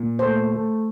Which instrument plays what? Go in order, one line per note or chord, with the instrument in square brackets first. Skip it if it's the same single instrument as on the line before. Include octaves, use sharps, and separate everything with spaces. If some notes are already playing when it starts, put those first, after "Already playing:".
Already playing: [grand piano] A#2
[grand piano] A3 [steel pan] C5
[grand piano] A3